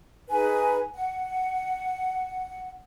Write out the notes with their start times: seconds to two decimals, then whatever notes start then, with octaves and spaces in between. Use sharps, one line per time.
0.30 D#4 G#4 B4 G#5
0.94 F#5